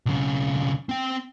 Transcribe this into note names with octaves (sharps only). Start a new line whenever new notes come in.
B1 C#3
C4 G5